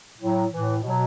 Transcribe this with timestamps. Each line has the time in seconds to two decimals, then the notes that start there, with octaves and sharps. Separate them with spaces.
0.18 A2 F#3
0.50 E3
0.55 A2
0.83 B2 F#3